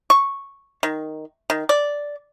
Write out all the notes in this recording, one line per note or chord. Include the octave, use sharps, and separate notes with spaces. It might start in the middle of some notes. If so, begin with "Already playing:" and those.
C#6
D#3
D#3
D5